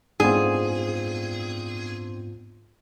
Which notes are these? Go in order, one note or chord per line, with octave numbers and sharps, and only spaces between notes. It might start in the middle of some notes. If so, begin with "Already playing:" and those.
G#2 B3 C4 D4 F4 G#4